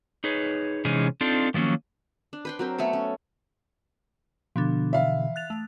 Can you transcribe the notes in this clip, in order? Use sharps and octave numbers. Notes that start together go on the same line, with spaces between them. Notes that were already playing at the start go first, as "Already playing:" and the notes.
D#4 G#4 B4 C#5
C3 E3 G#3 C#4 D#4 G#4
C4 D4 D#4 F4 A4
D#3 F3 F#3 A#3 C#4
D4
B4 G5 C6
F#3 C4 A#4 G5
A3 B3 A4 C#5
C#4
B2 D3 F3 B3 D4
E3 E5 F5
F#6 A6 F7
A3